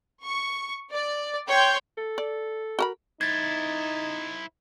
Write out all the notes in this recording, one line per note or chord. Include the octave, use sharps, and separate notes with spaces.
C#6
D5
C#5 G5 C6 G6
A4
D5
F#4 A#4 B5
D#4 E4 C5 G#6 A6